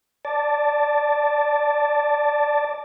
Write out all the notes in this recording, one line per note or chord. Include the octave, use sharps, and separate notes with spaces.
D5 A5